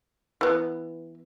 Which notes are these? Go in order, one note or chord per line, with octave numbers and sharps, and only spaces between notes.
E3 B3